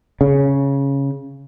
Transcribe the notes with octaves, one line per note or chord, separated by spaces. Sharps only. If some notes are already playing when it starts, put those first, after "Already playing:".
C#3